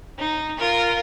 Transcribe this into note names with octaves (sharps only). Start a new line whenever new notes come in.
D#4
F4 A#4